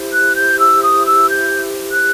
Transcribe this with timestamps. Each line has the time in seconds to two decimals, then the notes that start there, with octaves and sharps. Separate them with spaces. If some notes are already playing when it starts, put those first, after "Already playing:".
Already playing: E4 G4 C5
0.13 F#6
0.36 G6
0.59 E6
0.82 D#6
1.06 E6
1.29 G6
1.91 F#6